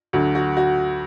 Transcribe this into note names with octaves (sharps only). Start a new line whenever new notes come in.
D2 D3 F#3 F#4
F#4
F#4